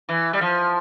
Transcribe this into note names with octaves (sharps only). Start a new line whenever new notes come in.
E3
G3
F3